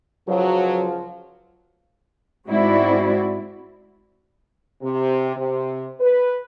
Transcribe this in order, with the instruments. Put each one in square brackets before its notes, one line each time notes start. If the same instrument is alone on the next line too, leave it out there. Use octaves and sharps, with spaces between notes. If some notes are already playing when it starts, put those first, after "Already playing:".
[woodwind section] C#2 F3 [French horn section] F#3
[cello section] G#2 G#3 C4 E4 F#4 D5
[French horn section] C3
C3
B4